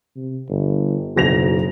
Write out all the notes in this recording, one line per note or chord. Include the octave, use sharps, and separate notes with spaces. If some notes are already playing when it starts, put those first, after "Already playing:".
C3
G1
F#1 B1 A#6 F7